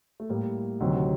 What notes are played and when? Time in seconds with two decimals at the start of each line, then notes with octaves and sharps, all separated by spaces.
0.20 A3
0.29 A2 G3 A#3
0.80 D2 C3 D#3 F#3